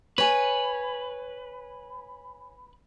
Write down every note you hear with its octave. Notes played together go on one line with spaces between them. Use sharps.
B4 C#5 G#5